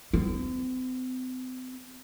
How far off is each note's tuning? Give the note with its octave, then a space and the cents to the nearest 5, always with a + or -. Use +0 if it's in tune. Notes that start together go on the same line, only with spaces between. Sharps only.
C4 -40